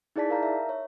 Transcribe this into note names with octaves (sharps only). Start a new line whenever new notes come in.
D#4 E4 G#4 D5 A5 B6
A#4 F5 A#5 G6
E5
C#5